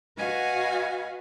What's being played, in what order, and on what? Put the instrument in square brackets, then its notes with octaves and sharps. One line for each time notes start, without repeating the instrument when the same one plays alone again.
[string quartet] F#4 B4 D#5 F5 F#5 G#5